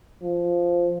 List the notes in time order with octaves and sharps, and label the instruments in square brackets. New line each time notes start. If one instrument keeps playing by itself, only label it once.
[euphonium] F3